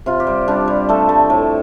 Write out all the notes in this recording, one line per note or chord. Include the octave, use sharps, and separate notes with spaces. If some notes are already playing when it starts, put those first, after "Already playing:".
C3 F4
G4
G3
G3 D4
G3
A3 A4
A3
A2